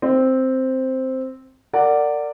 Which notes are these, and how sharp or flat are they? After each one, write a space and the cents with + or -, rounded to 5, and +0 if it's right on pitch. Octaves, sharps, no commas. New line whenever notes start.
C4 +0 C5 +0
A#4 -35 D5 +0 F#5 +0